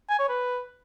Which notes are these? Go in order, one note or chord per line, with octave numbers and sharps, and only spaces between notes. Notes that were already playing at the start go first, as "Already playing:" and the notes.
G#5
C#5
B4